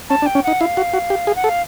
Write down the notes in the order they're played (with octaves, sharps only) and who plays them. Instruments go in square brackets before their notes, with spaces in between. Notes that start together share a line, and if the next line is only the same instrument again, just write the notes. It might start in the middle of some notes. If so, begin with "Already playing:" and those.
[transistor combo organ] C#4 [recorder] A5
[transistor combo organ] D4
[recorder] G5
[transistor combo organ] C#4
[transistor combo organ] D#4 [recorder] F#5
[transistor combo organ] E4 [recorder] F5
[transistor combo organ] F#4
F#4
G4
G#4
[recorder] F#5
[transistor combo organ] A4
[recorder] F5